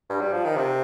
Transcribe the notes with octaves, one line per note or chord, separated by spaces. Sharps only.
G2
G3
F3
D#3
C3